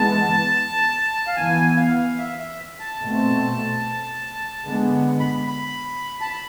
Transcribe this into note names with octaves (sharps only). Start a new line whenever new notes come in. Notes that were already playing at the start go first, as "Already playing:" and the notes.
Already playing: E3 G#3 B3 A5
F5
E3 B3 G#5
F5
E5
E5
A5
B2 A3 C4
D3 G#3 B3
B5
B5
A5
B5